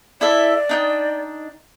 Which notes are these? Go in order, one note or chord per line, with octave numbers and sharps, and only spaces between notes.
E4 A4 D5 E5
D4 D#4 G5